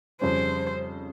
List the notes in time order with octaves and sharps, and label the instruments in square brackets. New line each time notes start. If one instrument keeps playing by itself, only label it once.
[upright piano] F2 C#3 G3 C#4 [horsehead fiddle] C5